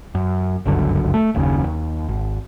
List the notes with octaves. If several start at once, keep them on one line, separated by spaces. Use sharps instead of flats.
F#2
G1 C#2 F#2 D3
A3
F#1 D#2 A#2 C#3
D#2
G#1